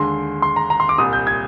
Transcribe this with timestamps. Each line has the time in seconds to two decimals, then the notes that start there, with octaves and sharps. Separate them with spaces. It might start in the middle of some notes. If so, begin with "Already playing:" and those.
Already playing: D#2 D3 G#3 C6
0.42 C6
0.56 A#5
0.70 A#5
0.80 C6
0.89 D6
0.98 C2 A#2 G3 D#6
1.13 G6
1.27 G#6